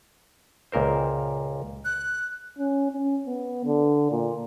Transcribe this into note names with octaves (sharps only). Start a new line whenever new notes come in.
C#2 A#2 A#4 C5
F#6
C#4
C#4
B3
D3
A#2